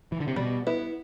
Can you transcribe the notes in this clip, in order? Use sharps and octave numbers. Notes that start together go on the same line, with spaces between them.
E3
D3
C3
B2 G3
B3 E4